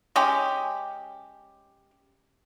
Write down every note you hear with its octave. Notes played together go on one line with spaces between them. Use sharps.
G#3 C#4 G4